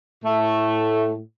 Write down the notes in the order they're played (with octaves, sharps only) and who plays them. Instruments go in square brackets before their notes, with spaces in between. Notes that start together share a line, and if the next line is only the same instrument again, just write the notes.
[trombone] A2 [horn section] A3